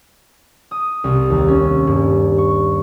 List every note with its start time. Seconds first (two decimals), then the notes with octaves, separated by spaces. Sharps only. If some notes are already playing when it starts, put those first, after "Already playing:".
0.71 D#6
1.04 C2
1.30 D#2
1.48 C#4
1.87 G2
2.38 C#6